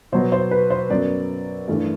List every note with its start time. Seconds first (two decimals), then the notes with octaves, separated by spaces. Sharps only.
0.12 B2 F#3 B3 C5
0.32 C5
0.51 B4
0.70 C5
0.90 F#2 F#3 B3 D5
1.68 G2 E3 A3